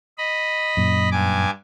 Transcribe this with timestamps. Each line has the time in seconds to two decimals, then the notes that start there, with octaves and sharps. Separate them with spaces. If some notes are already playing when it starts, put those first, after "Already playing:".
0.18 D#5 B5
0.77 F#2 A#2
1.12 G2 G#5 D6